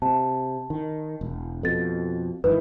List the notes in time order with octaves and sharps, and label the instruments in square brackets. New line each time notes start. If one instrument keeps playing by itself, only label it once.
[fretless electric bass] C3 [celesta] A5
[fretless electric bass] D#3
E1
[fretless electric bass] F2 B2 [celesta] A4 A6
[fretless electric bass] G1 D#3 E3 [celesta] B4